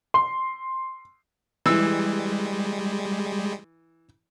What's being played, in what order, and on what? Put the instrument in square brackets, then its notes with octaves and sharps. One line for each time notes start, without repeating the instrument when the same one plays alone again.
[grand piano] C6
[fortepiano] E3 E6 [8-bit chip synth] G3 G#3